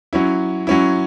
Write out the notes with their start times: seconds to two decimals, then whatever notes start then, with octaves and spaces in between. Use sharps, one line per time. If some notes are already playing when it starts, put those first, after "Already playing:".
0.13 F#3 C#4 E4
0.67 F#3 C#4 E4